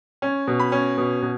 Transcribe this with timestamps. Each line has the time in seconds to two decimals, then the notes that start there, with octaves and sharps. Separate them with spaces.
0.22 C#4
0.47 B2
0.60 B5
0.72 C#4
0.98 B2
1.22 B2